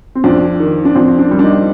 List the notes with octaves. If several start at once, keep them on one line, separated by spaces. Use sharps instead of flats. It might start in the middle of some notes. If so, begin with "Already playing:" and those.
C4
F2 D4
D#3
D4
F2 C4
D4
G3
D4
D#4